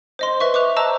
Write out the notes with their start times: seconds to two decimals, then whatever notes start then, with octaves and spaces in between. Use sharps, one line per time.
0.19 C5 D#5 C6
0.40 B4 E5 C#6
0.54 C#6 D6 F#6 F7
0.76 C5 D#5 A5 A#5 E6